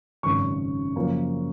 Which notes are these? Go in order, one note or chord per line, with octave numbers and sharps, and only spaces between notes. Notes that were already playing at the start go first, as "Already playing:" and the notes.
G#1 F#2 C#3 C#6
F#2 C#3 F3 A#3